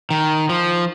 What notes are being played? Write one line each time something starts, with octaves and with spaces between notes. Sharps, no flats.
D#3
F3